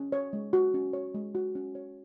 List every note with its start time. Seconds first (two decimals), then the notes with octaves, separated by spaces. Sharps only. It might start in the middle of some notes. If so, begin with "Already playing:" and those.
Already playing: C#4
0.12 C#5
0.33 G#3
0.53 F#4
0.74 C#4
0.93 C#5
1.14 G#3
1.35 F#4
1.55 C#4
1.75 C#5